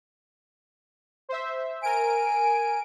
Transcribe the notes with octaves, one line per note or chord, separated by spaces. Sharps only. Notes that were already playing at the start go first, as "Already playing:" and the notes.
C5 E5
A#4 G#5 D7